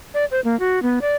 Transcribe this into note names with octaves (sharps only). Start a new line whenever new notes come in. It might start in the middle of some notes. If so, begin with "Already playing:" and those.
D5
C5
A#3
F#4
B3
D5